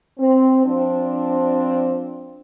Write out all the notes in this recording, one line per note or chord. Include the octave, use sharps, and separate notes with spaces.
C4
F3 C4 D4